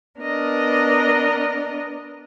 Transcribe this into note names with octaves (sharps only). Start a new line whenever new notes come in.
B3 D4 A#4 D#5